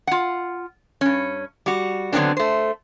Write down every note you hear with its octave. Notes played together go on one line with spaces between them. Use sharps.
F4 F#5
G2 C#4
G3 F#4
D3 F#3 G3 B3 C4 D4
A3 C5